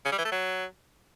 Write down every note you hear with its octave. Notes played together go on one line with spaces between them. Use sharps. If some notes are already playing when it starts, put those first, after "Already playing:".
C#3
G3
E3
A3
F#3